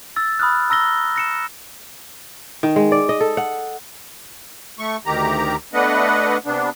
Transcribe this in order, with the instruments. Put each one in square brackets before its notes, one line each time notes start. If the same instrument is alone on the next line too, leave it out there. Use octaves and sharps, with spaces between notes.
[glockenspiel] E6 A6
B5 D#6 F6 F#6
A#5 E6 A#6 G7
A#6 C#7 E7
[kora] D#3
G#3
D5
D#5
A4
F#5
[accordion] A3 C#6
D2 D#3 G4 A#5
A3 B3 D4 B4 D#5 F#5
C3 B3 D4